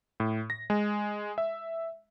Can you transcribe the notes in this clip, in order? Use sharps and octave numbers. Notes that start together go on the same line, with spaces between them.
A2
A#6
G#3
E5